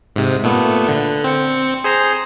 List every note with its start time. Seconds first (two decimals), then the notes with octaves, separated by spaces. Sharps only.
0.16 G#2 C3
0.43 A#2 A3 B3
0.88 D3
1.24 C4 C#7
1.84 G#4 C5 A#5